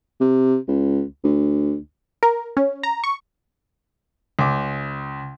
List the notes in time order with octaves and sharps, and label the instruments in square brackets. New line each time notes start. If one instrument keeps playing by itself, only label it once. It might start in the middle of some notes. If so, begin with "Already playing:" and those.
[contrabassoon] C3
C#2
D2
[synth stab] A#4
C#4
A#5
C#6
[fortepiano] C#2 D6